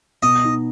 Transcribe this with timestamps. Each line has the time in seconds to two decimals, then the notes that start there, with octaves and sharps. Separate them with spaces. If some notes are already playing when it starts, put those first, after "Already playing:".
0.23 B2 D#5
0.44 D#4